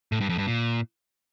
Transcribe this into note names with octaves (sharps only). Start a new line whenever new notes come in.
A2
G2
F2
G2
A#2